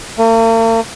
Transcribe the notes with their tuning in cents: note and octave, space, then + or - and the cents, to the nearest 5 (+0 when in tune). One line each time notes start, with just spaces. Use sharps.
A#3 -45